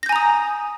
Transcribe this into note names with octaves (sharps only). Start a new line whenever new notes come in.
G#5 A#5 D#6 G6 A#6